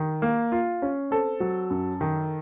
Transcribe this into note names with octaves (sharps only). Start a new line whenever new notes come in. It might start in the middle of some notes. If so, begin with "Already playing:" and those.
Already playing: D#3
A#3
F4
C#4
C4 A4
F#3
F#2
D#3